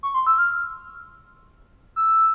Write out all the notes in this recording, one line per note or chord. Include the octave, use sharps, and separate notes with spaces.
C#6
C6
E6
F6
E6